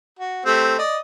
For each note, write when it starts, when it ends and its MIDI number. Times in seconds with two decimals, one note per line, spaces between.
0.19 0.44 66
0.46 0.78 57
0.46 0.78 60
0.46 0.78 67
0.78 0.98 74
0.78 0.98 75